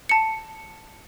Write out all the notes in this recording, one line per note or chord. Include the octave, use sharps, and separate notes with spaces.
A5 C#7